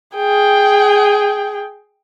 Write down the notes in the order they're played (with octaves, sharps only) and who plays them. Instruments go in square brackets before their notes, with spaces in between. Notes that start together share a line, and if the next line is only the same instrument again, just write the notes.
[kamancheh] G#4 G5